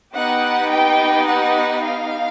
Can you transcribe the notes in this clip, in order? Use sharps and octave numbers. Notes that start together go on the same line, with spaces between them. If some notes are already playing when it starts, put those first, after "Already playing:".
B3 D#4 G4 F#5
G5
F#5
F5